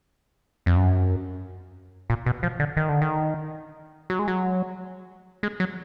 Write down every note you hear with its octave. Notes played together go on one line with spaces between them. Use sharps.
F2
F#2
A#2
B2
F3
D3
D#3
D3
D#3
F#3
G#3
F#3
G#3
F#3